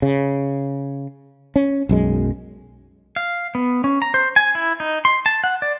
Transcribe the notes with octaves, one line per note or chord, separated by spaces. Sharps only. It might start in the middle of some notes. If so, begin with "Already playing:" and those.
C#3
C#4
B1 F#2 G#3
F5
B3
C#4
A#5
C5
G#5
E4
D#4
C6
A5
F#5
D5